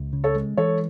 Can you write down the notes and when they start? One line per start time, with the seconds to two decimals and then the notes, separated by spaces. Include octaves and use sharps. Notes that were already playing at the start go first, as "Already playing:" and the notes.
Already playing: C#2
0.13 C#3
0.24 A4 C#5
0.35 G#3
0.57 E3 A4 C#5